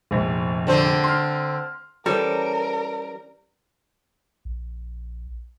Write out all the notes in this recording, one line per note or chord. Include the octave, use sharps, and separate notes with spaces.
F1 A#1
D3 C4 C5
C6 F6
E3 G3 C#4 A4 A#4 C5
A#1